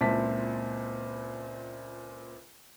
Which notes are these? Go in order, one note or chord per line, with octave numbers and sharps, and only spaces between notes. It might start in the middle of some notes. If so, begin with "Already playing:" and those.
C#2 A#2 C4 E4 A5 B6